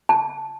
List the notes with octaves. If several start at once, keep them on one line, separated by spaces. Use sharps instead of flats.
A5